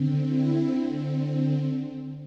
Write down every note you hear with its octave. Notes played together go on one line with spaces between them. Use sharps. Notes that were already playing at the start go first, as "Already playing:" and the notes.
Already playing: D3 C4
E4